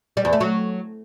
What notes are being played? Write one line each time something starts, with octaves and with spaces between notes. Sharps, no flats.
G3
E2
A3
F#3